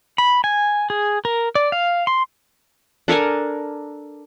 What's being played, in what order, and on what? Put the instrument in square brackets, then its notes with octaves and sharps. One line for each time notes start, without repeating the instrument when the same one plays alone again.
[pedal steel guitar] B5
G#5
G#4
A#4
D5
F5
C6
[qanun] D4 A4 A#4 G#5